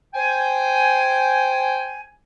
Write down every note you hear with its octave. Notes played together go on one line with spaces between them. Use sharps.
C5 G5 G#5